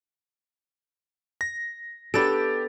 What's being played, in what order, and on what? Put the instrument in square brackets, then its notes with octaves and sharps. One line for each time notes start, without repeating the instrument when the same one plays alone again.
[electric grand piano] A#6
[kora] B3 D4 A4 [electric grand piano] G4 A6 D7